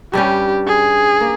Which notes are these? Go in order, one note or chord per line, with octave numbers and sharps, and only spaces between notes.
G2 G3 C#4 G4
G#4
A#3